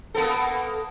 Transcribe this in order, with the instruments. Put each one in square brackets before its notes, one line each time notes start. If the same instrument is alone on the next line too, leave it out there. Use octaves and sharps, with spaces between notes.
[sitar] A#3 B3 A4